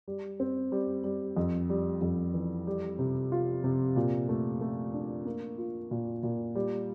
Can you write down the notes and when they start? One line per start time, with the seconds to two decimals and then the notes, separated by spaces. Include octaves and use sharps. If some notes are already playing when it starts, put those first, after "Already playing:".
0.08 G3
0.40 C4
0.72 G3
1.04 G3
1.37 F2
1.69 G3
2.02 F2
2.34 E3
2.67 G3
2.99 C3
3.32 F4
3.64 C3
3.96 A#2
4.29 A3
4.61 A3
4.94 D4
5.25 A#3
5.58 F4
5.91 A#2
6.23 A#2
6.55 G3